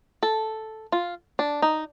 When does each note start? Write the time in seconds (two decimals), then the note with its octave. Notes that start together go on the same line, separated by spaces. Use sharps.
0.23 A4
0.92 F4
1.39 D4
1.62 D#4